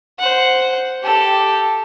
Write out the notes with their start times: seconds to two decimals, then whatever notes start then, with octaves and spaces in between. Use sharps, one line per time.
0.19 C5 F#5
1.03 G4 A4